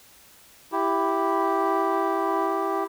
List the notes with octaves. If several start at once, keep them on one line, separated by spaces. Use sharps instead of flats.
E4 G4